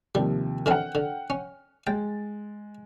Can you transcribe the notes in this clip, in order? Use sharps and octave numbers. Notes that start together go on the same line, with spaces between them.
D#2 C3 F3 G3
D3 E3 C4 F#5 G5 F6
D3
C#4
G#3 G5 A6